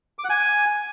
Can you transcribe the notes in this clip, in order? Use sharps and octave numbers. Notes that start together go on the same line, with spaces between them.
D6
F#5
G#5